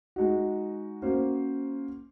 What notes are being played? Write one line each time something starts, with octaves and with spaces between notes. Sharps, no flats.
G#3 D#4 F#4
A#3 C#4 F#4 C5